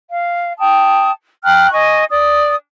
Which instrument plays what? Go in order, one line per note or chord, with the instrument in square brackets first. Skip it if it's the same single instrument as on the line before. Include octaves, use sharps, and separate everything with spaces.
[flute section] F5
G5 A5 D#6
G5 A#5 F6 F#6
D#5 G#5 C#6
D5 D#6